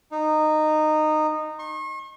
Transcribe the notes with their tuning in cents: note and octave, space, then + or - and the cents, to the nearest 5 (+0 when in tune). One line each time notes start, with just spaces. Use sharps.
D#4 -15
C#6 -45